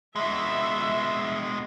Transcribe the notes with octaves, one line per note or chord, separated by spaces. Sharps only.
B2 G#3 E5